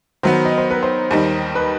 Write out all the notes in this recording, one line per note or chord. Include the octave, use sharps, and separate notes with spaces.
D#3 F#3 B3 C5
D#5
C5
B4
C5
D#2 D#3 G3 D#4
B4